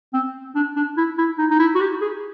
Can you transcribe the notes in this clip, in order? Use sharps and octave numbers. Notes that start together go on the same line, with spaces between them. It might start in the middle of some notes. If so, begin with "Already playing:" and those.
C4
D4
D4
E4
E4
D#4
D#4
E4
F#4
G4
G#4